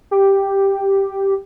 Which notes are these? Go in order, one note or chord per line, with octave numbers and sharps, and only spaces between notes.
G4